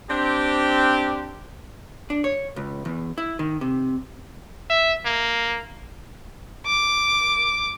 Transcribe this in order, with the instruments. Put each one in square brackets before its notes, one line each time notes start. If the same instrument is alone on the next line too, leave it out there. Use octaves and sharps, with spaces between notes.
[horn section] C4 D4 G4
[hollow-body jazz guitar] D4
C#5
C#2
E2
E4
D#3
C3
[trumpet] E5
A#3
[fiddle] D6